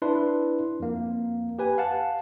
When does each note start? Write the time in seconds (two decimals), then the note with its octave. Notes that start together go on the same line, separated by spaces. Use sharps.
0.02 D4 E4 B4 C6
0.80 F2 A#3
1.59 G4 B4 G#5
1.78 F5 F#5 A5